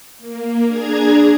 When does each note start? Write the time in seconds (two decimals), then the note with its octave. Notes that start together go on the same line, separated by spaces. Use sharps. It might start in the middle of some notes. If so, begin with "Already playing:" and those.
0.18 A#3
0.66 D4 G#4 A#5 G#6